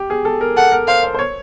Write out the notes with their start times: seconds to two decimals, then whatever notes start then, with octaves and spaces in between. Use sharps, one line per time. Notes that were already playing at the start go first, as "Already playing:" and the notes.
Already playing: G4
0.10 G#4
0.25 A4
0.41 A#4
0.56 A4 F#5
0.72 A#4
0.88 C5 F5
1.03 C5
1.15 C5
1.19 C#5